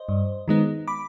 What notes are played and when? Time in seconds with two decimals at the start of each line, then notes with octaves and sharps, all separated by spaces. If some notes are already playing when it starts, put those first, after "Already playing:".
Already playing: C5 D#5
0.09 G2
0.48 D#3 G#3 B3 D#4
0.88 B5 D6